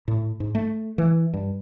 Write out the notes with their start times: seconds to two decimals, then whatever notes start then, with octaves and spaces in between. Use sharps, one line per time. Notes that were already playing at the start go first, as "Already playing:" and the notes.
0.08 A2
0.40 G#2
0.55 A3
0.98 E3
1.34 G2